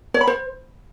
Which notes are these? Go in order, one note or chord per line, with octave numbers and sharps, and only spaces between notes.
C#5
B5
C5